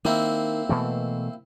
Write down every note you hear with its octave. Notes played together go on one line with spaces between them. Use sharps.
D#3 A#3 C4 E4
B2 E3 A3